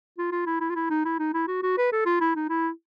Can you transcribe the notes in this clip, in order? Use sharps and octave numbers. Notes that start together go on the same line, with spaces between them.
F4
F4
E4
E4
F4
E4
D#4
E4
D#4
E4
F#4
F#4
B4
A4
F4
E4
D#4
E4